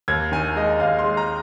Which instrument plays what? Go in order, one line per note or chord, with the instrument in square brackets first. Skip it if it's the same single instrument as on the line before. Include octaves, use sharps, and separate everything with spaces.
[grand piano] D#2 G#6
D#3 G#5
G#3 D#5
D#2 F5
C6
G#3
A#5